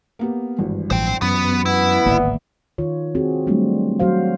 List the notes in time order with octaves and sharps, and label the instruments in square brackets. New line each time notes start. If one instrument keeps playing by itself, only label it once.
[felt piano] A#3 B3 G4
G#1 G2 E3
[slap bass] A1 F3 [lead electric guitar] C5 G5
[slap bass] F#2 [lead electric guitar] B3
[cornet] B3 [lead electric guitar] E4
[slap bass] D1 G#1 A#3 [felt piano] D5 E5
[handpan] D#3 F4 C#5
C4 F#4 G#4
F#3 G3 A3 C4 D4
F#3 F#4 C5 F5